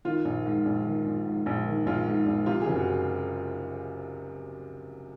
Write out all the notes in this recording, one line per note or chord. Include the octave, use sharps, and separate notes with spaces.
D#3 F4
A#1
G#2
A#1
D#3
A#1
G#2
A#1
D#3
A#1 F4
G#2
A#1
C3 F4
F#1 G#4
F#4